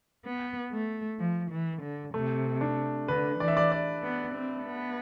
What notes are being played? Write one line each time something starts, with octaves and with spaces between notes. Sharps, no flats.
B3
A3
F3
E3
D3
C3 A3
D4
D3 B4
E3 D5
E5
D5
D5
B3
C4
B3